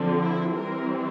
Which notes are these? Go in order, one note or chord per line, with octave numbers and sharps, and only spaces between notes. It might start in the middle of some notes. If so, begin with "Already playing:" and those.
Already playing: D3 F3 C4
E4
E3 G3 C4 A#4